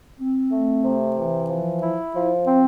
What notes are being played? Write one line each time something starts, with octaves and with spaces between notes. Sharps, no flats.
C4
A3
C3
E3
F3
E4
F3
C4